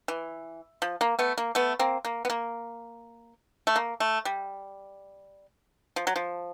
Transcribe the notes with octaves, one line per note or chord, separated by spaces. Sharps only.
E3
F3
A#3
A3 B3
A#3
A3 B3
A#3 C4
A#3
B3
A#3
A3
A#3
A3
G3
F3
F#3
F3